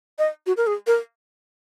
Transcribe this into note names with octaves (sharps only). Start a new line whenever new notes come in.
D#5
F#4
A#4
G#4
A#4